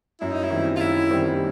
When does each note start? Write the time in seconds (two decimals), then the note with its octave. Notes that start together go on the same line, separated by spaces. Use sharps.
0.21 F#2 E4
0.32 D#4
0.44 E4
0.50 D#3 G3 C4
0.76 F4
0.80 F#2 E4
1.10 D#3 G3 C4